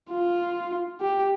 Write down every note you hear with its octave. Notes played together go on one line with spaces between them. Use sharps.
F4
G4